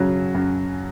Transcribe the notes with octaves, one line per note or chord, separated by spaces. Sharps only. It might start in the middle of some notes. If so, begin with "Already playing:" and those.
Already playing: F#2 C#3 F#3
F#2